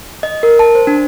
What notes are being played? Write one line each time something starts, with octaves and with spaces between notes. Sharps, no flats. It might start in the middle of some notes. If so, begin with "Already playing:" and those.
D#5
A#4
A5
C5
D4